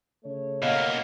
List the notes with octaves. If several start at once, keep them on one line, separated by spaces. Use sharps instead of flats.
C#3 A3 C#5
B2 A#3 D#5 F5 F#5